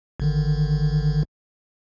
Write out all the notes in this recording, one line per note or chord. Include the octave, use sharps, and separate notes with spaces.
G#1 D3 D#3